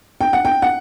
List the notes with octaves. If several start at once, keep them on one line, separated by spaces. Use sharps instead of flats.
G5
F#5
G5
F#5